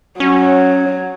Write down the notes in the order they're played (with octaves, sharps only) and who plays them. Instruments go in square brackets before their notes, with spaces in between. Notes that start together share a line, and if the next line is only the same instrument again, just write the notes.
[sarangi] F#3 [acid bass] C#4